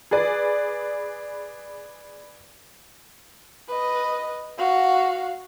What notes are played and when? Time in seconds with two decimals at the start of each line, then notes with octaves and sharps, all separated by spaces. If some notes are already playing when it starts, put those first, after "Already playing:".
0.11 G#4 B4 D5
3.69 B4 D#5
4.58 F#4 F5